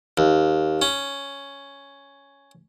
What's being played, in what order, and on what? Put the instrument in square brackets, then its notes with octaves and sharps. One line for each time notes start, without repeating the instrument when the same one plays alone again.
[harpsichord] D#2
C#4